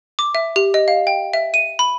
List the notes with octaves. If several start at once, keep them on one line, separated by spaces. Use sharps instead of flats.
D6
E5
G4
D#5
F5
G5
E5
D#7
B5